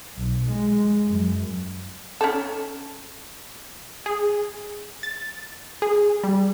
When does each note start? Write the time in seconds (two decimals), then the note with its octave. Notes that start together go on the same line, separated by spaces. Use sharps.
0.16 B1
0.47 G#3
1.08 F#2
2.21 C#4 D#4 A4
4.06 G#4
5.03 A6
5.82 G#4
6.23 G3